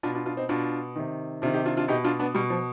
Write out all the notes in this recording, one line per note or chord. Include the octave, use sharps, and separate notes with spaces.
B2 D4 F4
D4 F4
D4 F4
C4 D#4
B2 D4 F4
C3 D#3
C3 D#3 D4 F4
D#4 G4
D4 F4
D4 F4
B2 D#4 G4
D4 F4
B3 D4
B2 G3
F3